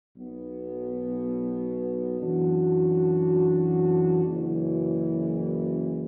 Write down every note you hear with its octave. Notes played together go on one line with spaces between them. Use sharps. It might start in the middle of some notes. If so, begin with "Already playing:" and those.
B1 B2 B3
F#2 E3 D4 F#4
F#1 F#2 E3